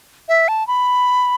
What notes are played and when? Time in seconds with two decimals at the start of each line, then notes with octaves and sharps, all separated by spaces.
0.29 E5
0.48 A5
0.67 B5